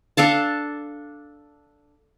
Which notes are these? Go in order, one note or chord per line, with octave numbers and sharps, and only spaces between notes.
D4 A4 F5 A5